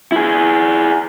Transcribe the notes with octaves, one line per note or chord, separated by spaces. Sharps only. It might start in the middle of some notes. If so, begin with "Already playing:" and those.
E4 G#4